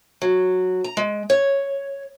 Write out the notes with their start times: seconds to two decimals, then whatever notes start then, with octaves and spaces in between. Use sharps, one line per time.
0.22 F#3
0.84 A#5
0.97 G#3
1.30 C#5